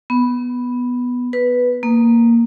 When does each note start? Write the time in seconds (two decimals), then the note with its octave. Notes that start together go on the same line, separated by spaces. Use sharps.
0.10 B3
1.33 B4
1.83 A#3